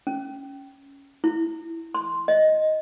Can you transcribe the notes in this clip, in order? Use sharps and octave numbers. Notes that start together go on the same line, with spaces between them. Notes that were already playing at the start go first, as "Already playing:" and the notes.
C#4
E4
C6
D#5